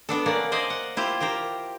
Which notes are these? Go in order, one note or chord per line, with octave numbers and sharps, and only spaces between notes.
B3 D4 A4
A#3 C#4 D5 F#5
C5 D5 D#5 G#5
F#5
E4 F4 G4 C5
G4 A#4 C5 G5